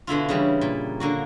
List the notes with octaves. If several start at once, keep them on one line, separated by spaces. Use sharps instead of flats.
B2 D3 E4 F4
C#3 E3 G3
A#2
D3 A#3 F#4